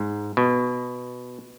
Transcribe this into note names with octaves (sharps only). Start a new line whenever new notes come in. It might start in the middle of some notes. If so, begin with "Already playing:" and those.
Already playing: G#2
B2